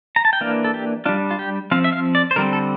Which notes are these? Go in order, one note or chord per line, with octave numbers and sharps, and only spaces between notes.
A#5
A5
G5
E3 A#3 D4 F5
A4
G4
G3 D4 F4
F4
G4
F3 C4 F5
E5
F5
D5
C5
D3 G3 C4 A#4
A4